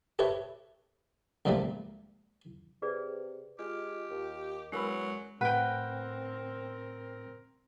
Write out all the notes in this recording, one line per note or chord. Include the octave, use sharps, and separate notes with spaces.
G4 A4 B4 C#5 E5
C#2 A#2 F3 G3 A3 A#3
C3 G#4 B4 D5
G#3 F4 G4
D#2
E2 F#3 G#3 C#4 A#4 B5
A2 C4 A#4 B4 F#5 G5